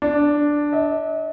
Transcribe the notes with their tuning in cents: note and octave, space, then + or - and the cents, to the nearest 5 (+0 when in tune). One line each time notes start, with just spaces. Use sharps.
D4 +0
D#5 +45